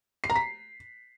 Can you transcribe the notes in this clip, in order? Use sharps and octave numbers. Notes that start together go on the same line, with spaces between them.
C7
A#5
B6